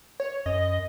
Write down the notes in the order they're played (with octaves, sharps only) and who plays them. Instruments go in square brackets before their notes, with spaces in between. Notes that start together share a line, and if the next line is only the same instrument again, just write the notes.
[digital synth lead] C#5
[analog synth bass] F#2 [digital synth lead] D#5